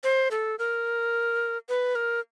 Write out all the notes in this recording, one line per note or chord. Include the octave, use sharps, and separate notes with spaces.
C5
A4
A#4
B4
A#4